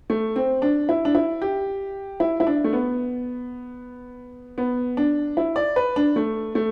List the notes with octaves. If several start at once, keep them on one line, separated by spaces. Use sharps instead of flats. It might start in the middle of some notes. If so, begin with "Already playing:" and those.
A3
C4
D4
E4
D4
E4
G4
E4
E4
D4
A3
B3
B3
D4
E4
D5
B4
D4
A3
A3